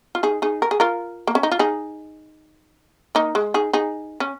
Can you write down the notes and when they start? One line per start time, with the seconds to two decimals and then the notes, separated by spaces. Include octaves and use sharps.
0.15 F4
0.23 D#4 G#4
0.42 D#4 G#4
0.62 A#4
0.71 G#4
0.80 F4 A#4
1.27 A#3
1.35 C#4
1.43 D#4
1.52 F4
1.59 D#4 G#4
3.15 A#3 D#4
3.35 G#3
3.54 D#4 G#4
3.73 D#4 G#4
4.20 C#4